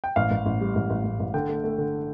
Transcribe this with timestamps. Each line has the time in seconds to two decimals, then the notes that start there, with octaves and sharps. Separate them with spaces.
0.04 G5
0.16 A1 F5
0.31 A1
0.46 A1
0.61 G3
0.75 A1
0.90 A1
1.05 A1
1.20 A1
1.34 D3 G5
1.49 A3
1.64 A3
1.78 D3